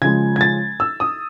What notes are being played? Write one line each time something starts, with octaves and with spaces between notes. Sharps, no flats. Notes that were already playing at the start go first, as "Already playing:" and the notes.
C#3 F3 G#3 G#6
G#6
A6
E6
D#6